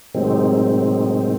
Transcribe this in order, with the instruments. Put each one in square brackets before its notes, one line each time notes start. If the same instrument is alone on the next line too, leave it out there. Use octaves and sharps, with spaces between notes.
[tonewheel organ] A2 C3 D#3 F#3 G#3 C4